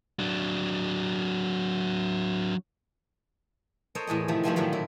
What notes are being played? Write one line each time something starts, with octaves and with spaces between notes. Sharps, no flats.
F#3 D4
A4 A#4 C5 C#5 D#5
E2 A2 G#4 D#5
C3 D#3 F3 A3
G2 F3 A3 C4 G#5 C6
A2 D3 D#3 F#3 A3
A#2 E4